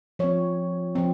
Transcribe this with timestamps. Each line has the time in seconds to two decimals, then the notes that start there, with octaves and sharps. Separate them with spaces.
0.19 F3 C4 C#5
0.95 F3 C4